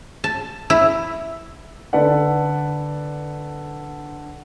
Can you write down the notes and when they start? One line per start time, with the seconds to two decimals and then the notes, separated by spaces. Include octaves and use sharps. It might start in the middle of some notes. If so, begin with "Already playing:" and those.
0.24 A5
0.70 E4
1.93 D3 A4 B4 D5 F#5